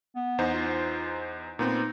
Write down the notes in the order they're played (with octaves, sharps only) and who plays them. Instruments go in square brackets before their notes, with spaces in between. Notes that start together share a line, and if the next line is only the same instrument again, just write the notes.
[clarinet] B3
[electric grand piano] E2 D#4 C5
[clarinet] F4
[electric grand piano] A#2 B3 C4 [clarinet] D#4